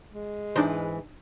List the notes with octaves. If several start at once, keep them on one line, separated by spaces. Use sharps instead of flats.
G#3
G#2 E3 D4 D#4 C5